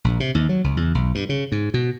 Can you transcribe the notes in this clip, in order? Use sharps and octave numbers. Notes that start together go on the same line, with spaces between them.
A#1
C3
D#2
F#3
C#2
E2
B1
G2
C#3
G#2
B2